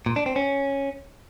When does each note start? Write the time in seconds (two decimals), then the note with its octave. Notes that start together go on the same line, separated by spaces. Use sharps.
0.06 A#2
0.16 D4
0.26 C4
0.36 C#4